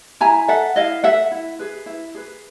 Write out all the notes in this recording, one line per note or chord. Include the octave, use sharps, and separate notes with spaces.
E4 G#5 A#5
A4 E5 F#5
E4 D#5 F5
A4 E5 F#5
E4
G#4 B4
E4
G#4 B4